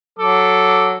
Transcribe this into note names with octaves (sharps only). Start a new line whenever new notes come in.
F#3 A4 D6